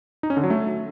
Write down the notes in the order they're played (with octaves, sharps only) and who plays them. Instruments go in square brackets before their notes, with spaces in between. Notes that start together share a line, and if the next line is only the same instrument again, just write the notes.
[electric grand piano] D#4
C#4
D3
F#3
A3